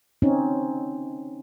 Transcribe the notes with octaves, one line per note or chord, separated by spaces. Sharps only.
C4 C#4 D#4